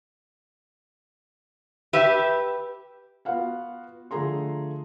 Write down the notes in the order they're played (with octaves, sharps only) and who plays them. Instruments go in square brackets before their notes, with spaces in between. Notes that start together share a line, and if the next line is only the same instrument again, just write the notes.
[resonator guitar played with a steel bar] G4 B4 E5
[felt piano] B3 F4 F#4 F5 F#5
D3 F3 A3 G#4 A#5 C6